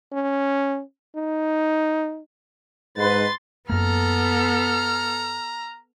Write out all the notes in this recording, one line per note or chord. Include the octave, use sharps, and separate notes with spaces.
C#4
D#4
G#2 B4 C6 A6
F#2 A#3 B3 A4 A#5 F6